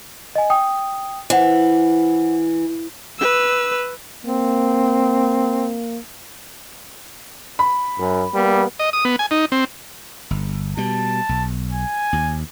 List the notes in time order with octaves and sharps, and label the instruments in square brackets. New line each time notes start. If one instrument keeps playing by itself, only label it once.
[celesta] D#5 G#5
G5 D#6
[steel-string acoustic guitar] E3 [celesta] C5 F#5
[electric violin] B4 E6
[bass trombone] A#3 [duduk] C4
[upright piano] B5
[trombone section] F#2
G3 A#3 B3
[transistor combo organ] D#5
D#6
B3
G#5
D#4
C4
[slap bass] G1
[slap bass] B2 G3 [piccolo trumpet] A5
[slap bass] B1
[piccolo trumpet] G#5
[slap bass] D#2